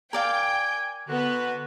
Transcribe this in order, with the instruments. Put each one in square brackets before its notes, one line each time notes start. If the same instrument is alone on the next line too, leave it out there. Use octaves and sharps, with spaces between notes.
[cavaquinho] A#4 D5 F5 [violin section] G5 [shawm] G#5
[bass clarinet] D3 [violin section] B3 B4 [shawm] F#4